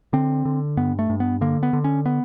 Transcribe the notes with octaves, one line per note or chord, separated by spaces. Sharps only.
D3 C4
D3
G2 B3
A3
G2
B3
D3 A#3
B3
D3
C#4
B3